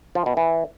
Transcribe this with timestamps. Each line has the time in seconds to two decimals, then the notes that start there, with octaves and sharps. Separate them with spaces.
0.15 F3
0.26 B2
0.37 E3